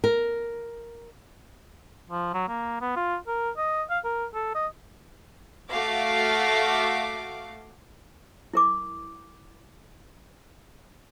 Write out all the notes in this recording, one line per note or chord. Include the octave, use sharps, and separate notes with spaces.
A#4
F3
F#3
A#3
B3
F4
A#4
D#5
F5
A#4
A4
D#5
A3 F#4 F5 D6
E4 A#4 D6